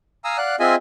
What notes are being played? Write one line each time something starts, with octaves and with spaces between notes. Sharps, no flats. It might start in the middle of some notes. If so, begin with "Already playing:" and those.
F5 G#5 A#5 D#6 E6
D5 F5 F#5 F#6
C4 F4 G#4 D#5 E5 G#5